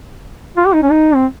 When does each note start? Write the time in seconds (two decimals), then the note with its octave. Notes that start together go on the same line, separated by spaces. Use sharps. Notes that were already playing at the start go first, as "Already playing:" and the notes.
0.57 F4
0.66 G4
0.74 D#4
0.83 C#4
0.91 D#4
1.15 C4